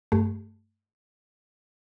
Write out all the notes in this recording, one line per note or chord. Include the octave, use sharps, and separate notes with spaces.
G2 A3